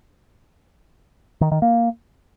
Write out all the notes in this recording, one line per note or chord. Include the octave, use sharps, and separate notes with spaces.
D#3
D#3
A#3